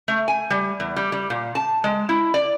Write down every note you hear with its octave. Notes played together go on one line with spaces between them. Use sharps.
A3
G#5
G3
E2
G3
G3
A#2
A5
G#3
E4
D5